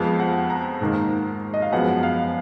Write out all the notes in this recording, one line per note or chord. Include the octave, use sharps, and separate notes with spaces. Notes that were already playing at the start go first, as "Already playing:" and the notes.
Already playing: F2 F3 G#3 B3 F5
F#5
A#5
G#2 D#3 A#3
D#5
F5
F#2 F3 G#3 B3 F#5
F5